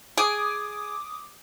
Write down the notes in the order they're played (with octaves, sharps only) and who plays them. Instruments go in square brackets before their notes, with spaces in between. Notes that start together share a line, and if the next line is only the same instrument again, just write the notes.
[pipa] G#4 [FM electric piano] D6 D#6